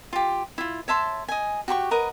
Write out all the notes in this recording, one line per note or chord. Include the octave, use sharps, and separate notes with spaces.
F4 G4
E4 F4
C#5 E5 A5 C6
D#5 G#5
F#4 G4 B5 C#6
A#4 B4 D#5 F#5